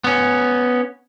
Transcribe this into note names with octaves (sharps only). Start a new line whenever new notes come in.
B3 C#4